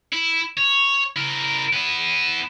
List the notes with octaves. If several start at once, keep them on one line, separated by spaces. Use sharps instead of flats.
E4
C#5
E4 A#4
B3 E4